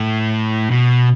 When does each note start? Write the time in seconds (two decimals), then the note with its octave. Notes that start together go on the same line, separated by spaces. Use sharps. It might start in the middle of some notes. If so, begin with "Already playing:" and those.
Already playing: A2
0.71 B2